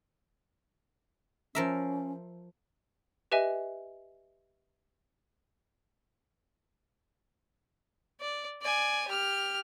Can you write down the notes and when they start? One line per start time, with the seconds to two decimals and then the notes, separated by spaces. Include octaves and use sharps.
1.55 F3 C#4 A#4 E5
3.32 G4 B4 D#5 E5 G#5
8.21 D5
8.62 D5 G#5
9.08 G4 F6